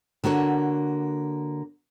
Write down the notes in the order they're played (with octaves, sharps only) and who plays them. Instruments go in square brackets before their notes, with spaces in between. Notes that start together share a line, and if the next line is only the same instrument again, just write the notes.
[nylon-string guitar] D3 A#3 F#4 C#5